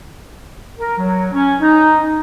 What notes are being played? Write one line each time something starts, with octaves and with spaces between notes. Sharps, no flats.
A#4
F#3
C#4
D#4